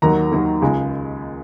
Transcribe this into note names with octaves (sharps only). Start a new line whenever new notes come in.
D#2 D#3 F#3 A#3 A#5
D#2 D#3 F#3 A#3
C#2 C#3 G#3